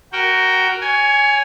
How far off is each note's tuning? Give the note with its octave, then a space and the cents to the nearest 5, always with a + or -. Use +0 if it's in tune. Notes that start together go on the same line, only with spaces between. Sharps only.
F#4 +15 A#4 +0 G5 +0
C#5 +20 G#5 +0